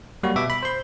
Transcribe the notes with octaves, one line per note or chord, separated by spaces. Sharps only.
F#3 G3 A#3 F#4
B2 E5 D6
B5
C5 C6